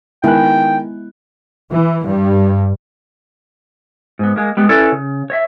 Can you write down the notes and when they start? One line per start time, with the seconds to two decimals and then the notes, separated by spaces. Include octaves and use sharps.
0.24 D#3 G#3 B3 E4 G5 G#5 F#6
1.70 E3
2.04 G2
4.19 G#2 B3
4.36 G#3 A#3
4.57 G3 G#3 B3
4.69 C#4 E4 A4 B4 C#5 D5
4.92 C#3
5.30 C#5 D#5 E5